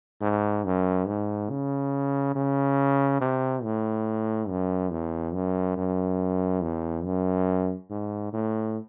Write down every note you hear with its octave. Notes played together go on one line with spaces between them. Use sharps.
G#2
F#2
G#2
C#3
C#3
C3
A2
F#2
E2
F#2
F#2
E2
F#2
G#2
A2